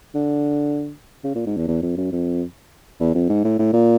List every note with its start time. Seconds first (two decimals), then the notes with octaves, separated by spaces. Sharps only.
0.15 D3
1.24 C#3
1.35 A#2
1.46 G#2
1.57 E2
1.68 E2
1.83 F2
1.97 F#2
2.12 F2
3.00 E2
3.14 F2
3.29 G#2
3.44 A2
3.59 A2
3.73 A#2